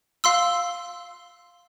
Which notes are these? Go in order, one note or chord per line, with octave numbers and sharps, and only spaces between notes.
F5 C6 E6